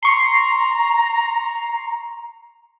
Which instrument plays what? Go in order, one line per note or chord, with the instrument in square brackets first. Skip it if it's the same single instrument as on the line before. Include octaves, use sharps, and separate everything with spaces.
[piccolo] A#5 [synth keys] C6 C#6 C7